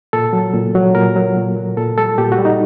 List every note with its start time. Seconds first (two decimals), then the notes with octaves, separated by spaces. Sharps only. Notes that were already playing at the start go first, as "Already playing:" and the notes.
0.13 A#2 A4
0.33 F#3
0.54 A#2
0.75 F#3
0.95 A#2 A#4
1.16 F#3
1.37 A#2
1.57 F#3
1.77 A#2 A4
1.98 G3 A4
2.18 A#2 G4
2.32 F#4
2.39 G3
2.45 D#4